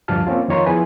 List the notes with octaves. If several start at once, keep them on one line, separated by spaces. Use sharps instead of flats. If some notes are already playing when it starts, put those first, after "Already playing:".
D2 G2 F3 D4 A5 F6
A#3 C4 C#4 F4
F2 D#3 F4 C#5 A#5 C6
F3 B3 E4 G#4 B4 G#5